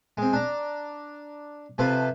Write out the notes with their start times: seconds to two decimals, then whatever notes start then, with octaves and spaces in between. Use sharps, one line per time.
0.17 G#3 C4
0.33 D4 A#5
1.78 C3 F3 A4 B4 C5